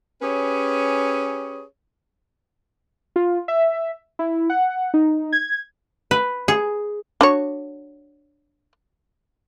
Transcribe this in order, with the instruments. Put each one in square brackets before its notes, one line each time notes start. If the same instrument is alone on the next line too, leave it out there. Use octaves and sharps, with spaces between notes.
[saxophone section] C#4 G4 G#4 B4 C#5
[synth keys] F4
E5
E4
F#5
D#4
G#6
[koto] B4
G#4
[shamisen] D4 F#4 C#5